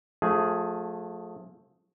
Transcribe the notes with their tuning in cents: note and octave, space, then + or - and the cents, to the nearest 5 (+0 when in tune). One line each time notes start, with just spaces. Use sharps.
F3 +35 A3 +0 G#4 +0